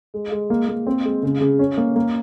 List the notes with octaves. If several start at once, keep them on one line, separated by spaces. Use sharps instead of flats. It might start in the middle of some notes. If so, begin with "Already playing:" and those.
G#3
G#3
A#3
A#3
C4
G#3
C#3
C#3
C#4
A#3
A#3